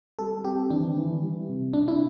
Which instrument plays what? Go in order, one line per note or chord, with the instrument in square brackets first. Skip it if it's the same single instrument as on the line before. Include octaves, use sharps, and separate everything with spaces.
[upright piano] G3 [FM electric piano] A4
[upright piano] C4 [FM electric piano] G4
[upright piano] E3 [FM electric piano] D4
[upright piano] E3
G3
C3
[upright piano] C3 [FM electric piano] D4
[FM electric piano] E4